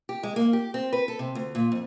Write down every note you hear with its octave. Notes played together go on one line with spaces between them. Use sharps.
G4
G#3
A#3
G4
C4
B4
A4
C3
D2
A#2
F2